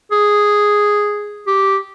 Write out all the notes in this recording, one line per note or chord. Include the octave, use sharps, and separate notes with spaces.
G#4
G4